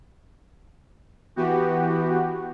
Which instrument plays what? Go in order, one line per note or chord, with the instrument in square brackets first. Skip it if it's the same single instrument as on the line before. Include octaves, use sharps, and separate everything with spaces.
[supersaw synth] E3 B3 F#4 G4